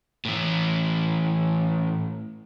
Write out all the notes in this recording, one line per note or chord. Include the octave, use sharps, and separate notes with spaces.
A2 E3